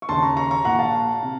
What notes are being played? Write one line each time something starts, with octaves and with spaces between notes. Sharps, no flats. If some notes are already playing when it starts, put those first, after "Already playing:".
C#6
D#2 C#3 A5 C6
A#5 C#6
A#5 C#6
A#5 C#6
A#1 A#2 F#5 A#5
F5 A5
C3